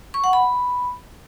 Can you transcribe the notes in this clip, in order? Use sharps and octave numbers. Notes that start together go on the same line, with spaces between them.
C#6
F#5
B5